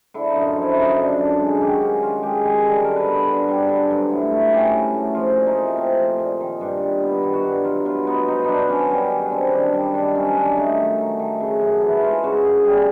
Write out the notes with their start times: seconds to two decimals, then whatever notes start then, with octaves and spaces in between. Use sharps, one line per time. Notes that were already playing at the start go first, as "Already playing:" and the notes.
0.14 D3 E4
0.30 D#4
0.36 F#2
0.46 F4
0.57 F3
0.62 E4
0.77 F#2 D#4
0.98 D3
1.09 D4
1.19 F#2
1.40 G#3
1.61 D#3 G4
1.71 F#4
1.82 C#4
2.02 D#3 F4
2.23 G#3 G4
2.44 D#3 G#4
2.65 G3 A4
2.84 D3 A#4
2.96 B4
3.07 B3
3.28 D3 B4
3.48 G3
3.69 D3
3.90 F#3
4.11 A2
4.31 A3
4.53 C#4 G4
4.73 F#3
4.94 A2
5.14 F3 F4
5.36 A#2
5.47 D#4
5.57 A3
5.77 C4
5.98 F3
6.19 A#2
6.40 D#3
6.61 G2
6.81 G3
7.02 B3
7.23 D#3
7.34 F#4
7.44 G2
7.64 F#3 F4
7.85 B2 F4
8.07 B3 D#4
8.28 B2 D#4
8.44 F#3 D4 D#4
8.69 B2 C#4
8.90 G3 C#4
9.11 D#3
9.21 D4
9.31 C4
9.52 D#3 D4
9.74 G3
9.94 D#3 D4
10.15 F#3 C#4
10.26 C#4
10.36 D#3 D4
10.57 A3 D#4
10.77 D#3
10.98 F#3
11.19 D#3
11.40 C#3
11.61 F#2
11.81 E3
12.02 G#3 F4
12.24 C#3 F#4
12.44 F#2 G#4
12.64 G3 G#4